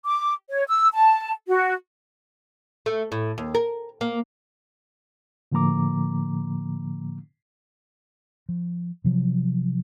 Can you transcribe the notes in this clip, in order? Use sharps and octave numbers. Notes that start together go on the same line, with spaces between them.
D6
C#5
E6
A5
F#4
A3
A2
D#2
A#4
A#3
A2 D3 F3 A#3 A#5 D6
F3
C3 F3 F#3